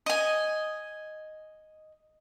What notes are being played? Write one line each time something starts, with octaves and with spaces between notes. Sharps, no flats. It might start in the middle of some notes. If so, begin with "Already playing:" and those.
D#5 G#5